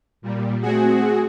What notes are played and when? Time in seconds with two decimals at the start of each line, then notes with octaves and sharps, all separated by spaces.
0.22 A#2 G3
0.62 A3 C4 F#4 G#4